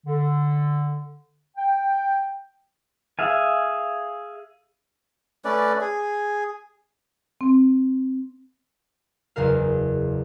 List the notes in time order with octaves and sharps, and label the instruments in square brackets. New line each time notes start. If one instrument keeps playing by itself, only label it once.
[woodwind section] D3
G5
[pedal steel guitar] G#4 E5 F5 G#5
[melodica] A3 C#4 B4 D5
G#4
[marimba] C4
[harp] F#1 E2 C#3 A#4 F5